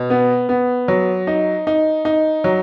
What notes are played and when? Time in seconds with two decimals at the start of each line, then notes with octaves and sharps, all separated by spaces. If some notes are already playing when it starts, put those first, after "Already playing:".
Already playing: B2
0.10 B3
0.49 B3
0.88 F#3
1.27 D#4
1.67 D#4
2.05 D#4
2.44 F#3